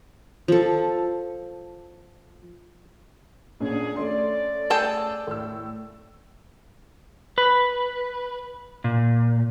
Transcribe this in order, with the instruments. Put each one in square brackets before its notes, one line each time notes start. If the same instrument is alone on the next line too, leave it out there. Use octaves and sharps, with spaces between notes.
[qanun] F3 A4
[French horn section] F2 D3 G#4 [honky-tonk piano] A#2 C#4 D4
[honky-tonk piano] A3 C#4 C6 [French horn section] D5
[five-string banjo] G#4 A4 G5
[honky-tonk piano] A2 E6
[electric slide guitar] B4
A#2